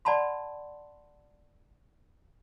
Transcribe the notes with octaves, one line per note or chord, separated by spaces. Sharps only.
D5 F#5 A5 B5 C6